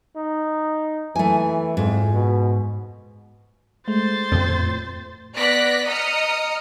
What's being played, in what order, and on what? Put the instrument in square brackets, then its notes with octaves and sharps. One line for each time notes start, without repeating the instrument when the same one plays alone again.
[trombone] D#4
[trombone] E3 [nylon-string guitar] A3 G#5
[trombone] F2 [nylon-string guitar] G#2
[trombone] B2
[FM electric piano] G#3 A3 [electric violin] C5 A6
[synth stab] F2 [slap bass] A2 C4
[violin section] B3 D5 F#6 A#6 B6
D#5 A#5 D#6 F6 C#7